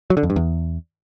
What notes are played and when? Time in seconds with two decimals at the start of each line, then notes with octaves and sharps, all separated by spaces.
0.10 F#3
0.17 D3
0.23 F2
0.30 G2
0.36 E2